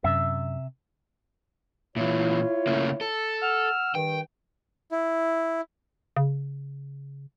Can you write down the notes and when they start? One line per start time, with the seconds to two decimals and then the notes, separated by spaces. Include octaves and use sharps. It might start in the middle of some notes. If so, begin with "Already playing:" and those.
0.04 F#2 C3 E5
1.96 A#2 E3 E4 F4 C#5
2.67 C#3 A3 A#3
3.01 A4
3.42 F#5 E6 F6
3.95 G2 D#3 G5
4.91 E4
6.17 C#3